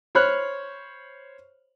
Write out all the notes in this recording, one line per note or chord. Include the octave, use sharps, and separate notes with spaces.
C5 C#5 B5 F6 F#6